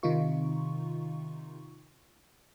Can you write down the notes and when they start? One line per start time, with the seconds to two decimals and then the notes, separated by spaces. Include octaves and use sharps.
0.03 C3 D#3 D#4 F4 C#6